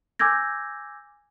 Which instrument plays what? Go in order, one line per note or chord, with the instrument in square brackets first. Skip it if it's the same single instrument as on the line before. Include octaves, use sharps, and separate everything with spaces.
[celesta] G#5 D6 E6 G6 G#6 A#6